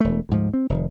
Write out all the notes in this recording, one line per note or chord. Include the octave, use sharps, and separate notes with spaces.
E1 A3
D2 G#2 F3
C4
F1 A2 D#3